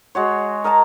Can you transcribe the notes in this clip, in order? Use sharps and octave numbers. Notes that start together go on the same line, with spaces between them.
G#3 F#4 C#5
A#4 D#5 A5 A#5